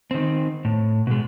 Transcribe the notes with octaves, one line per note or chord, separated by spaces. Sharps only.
D#3 C4
A2
B2 G#3